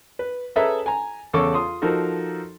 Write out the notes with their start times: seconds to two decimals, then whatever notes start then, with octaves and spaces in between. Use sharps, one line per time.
0.19 B4
0.56 C#4 G#4 A4 B4 E5 A#5
0.86 G#5 A#5
1.34 E2 C#3 A4 C#6 D6
1.54 F4 C6 D#6
1.82 F3 D#4 F#4 A4 A#4